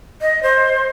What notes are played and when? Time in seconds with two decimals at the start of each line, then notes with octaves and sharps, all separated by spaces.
0.21 D#5
0.43 C5